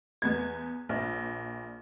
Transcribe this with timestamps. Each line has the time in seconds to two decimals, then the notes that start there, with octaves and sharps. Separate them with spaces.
0.22 E2 B3 G#6
0.89 A#1